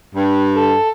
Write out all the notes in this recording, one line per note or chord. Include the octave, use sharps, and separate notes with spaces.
G2
A4